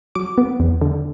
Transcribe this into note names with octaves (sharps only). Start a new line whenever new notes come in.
F#3 D6
B3
E2
D3